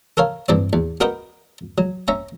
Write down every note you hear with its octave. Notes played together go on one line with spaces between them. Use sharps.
A4 A#4 C#5 F5
G2 E3 C4 D5
E2
F#4 A#4 B4 D#5 F#5 G5
F#3
C#4 E5 A#5